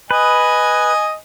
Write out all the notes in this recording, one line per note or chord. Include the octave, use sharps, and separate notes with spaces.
B4 D#5 G#5